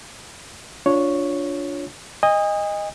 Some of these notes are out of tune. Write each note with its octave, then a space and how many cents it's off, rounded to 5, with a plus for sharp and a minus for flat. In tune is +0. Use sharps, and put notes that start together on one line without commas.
D4 -15 F4 +10 C#5 +0
D#5 +0 G#5 -40